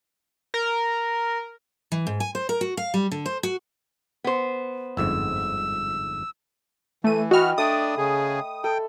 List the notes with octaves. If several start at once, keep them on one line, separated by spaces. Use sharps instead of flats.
A#4
E3
G#2
G#5
C5
A#4
F#4
F5
G3
D3
C5
F#4
B3 C5
G1 F2 G#2 E6
E3 A3 D#7
F#4 D#5 G5 B5 F6
A3 D4 D5 D#6
C#3 G#4
A4 G5